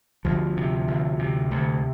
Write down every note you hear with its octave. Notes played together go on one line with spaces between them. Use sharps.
D2 F3
C3
D2
C3
D2